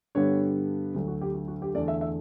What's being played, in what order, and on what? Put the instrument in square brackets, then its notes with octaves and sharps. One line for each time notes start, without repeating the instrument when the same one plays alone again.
[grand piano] G2 D3 G3 B3 C#5
D2 D3 F#3
F#4
G4
F#4
F#4
G4
E2 D3 A3 D5
E5
E5